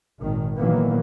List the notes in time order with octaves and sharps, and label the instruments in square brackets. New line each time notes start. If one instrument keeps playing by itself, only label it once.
[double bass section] G#1 A#2 D#3
A#2 D#3 E3 F#3 A#3 B3